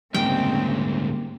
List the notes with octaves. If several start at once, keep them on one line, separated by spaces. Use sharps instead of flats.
D2 G#2 C#3 G3 A#3 C4 G5